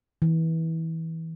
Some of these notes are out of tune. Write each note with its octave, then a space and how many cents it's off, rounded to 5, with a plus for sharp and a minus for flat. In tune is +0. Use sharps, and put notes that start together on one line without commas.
E3 -25